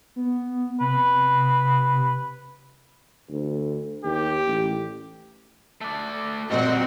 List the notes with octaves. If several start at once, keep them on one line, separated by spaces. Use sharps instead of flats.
B3
C3 B4
D2
D#2 G4
A1
A3 D5
A#2 G3 C4 F#4 D#5 F#5